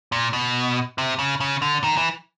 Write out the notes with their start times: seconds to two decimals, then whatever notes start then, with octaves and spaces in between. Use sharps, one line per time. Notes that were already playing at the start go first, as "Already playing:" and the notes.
0.12 A#2
0.33 B2
0.98 C3
1.19 C#3
1.40 C#3
1.62 D3
1.84 D#3
1.97 E3